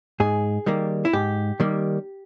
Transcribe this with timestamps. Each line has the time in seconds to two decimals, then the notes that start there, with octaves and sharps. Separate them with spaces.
0.20 G#2 G#4
0.66 D#3 G3 A#3
1.05 E4
1.13 G#2 G4
1.60 D#3 G3 A#3